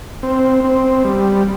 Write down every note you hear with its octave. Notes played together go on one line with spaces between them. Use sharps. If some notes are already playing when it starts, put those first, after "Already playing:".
C4
C4
G3